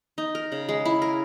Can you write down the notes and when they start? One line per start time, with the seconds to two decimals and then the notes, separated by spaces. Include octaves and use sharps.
0.18 D#4
0.35 A#4
0.52 C#3
0.69 G#3
0.85 E4
1.02 A#4